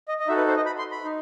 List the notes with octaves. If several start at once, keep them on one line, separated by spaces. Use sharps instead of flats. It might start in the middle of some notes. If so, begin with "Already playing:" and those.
D#5
D#5
D#4 F#4 A4 E5
B4
C5
D#5
B5
C6
B5
D#4